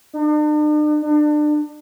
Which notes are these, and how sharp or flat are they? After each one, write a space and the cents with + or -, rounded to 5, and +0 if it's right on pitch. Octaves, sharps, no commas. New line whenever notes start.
D4 +45
D4 +30